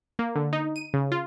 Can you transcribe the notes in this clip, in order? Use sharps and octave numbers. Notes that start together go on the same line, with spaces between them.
A#3
D3
D#4
D#7
C#3
F4